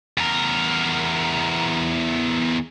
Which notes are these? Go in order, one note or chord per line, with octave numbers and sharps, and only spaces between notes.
E2 A#4